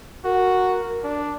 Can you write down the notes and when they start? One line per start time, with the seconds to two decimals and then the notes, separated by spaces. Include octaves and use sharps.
0.25 F#4 A#4
1.04 D4